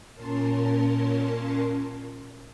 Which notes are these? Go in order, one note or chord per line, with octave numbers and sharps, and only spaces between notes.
A#2 C#4 A#4 A5 C6